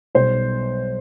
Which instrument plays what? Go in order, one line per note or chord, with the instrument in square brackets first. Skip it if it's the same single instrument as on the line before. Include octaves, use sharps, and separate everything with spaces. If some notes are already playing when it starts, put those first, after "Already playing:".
[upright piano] B1 B2 G3 C5